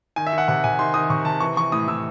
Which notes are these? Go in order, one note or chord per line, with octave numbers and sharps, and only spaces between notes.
D#3 G#5
E5
D#3 F#5
C3 F#5
C3 G#5
D#3 C6
D#3 D#6
C3 C#6
C3 A5
E3 C#6
E3 C#6
A2 D#6
A2 E6